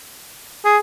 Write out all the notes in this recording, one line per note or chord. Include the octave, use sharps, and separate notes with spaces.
G#4